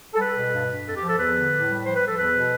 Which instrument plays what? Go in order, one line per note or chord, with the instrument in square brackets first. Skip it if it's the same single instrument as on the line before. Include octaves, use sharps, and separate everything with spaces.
[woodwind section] A4
G3 B4
B2
G2
G2
F2 A4
G4
F3
A4
E2 B4
D3
A2
G3
F3 C5
B4
F3
A4
E2 B4
B2